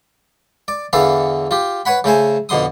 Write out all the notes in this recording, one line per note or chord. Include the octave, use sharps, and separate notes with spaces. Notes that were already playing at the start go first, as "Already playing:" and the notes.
D5
E2 D3 E3 A4 F5
F4 G4
B4 C#5 F#5 B5
C#3 A3 C5 G#5
F2 B2 D3 C6 D#6